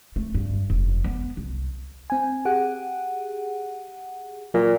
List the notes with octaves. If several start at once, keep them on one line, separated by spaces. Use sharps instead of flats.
A3
G2
F1
B3
C2
C4 G#5
G4 G#4 F#5
A#2 F#3